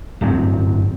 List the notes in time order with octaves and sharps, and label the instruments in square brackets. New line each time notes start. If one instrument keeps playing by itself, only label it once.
[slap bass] D1 G1 F#2 C4